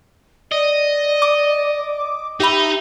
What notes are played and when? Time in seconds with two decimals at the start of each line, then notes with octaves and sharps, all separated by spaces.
0.52 D5 D#5
1.22 D6
2.40 D#4 G4 E5 B5